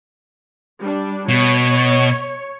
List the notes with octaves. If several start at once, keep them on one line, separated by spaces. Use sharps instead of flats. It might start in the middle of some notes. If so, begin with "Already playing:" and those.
G3 D4
B2 C#5